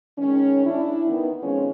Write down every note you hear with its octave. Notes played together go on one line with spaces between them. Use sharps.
D#3 G#3 C#4
D4 E4
D#3 B3
F2 D#3 G#3 C#4 F4